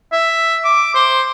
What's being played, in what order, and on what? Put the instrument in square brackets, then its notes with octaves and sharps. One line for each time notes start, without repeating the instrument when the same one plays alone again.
[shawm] E5
D6
C5